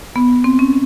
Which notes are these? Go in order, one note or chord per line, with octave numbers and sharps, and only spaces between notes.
B3
C4
C#4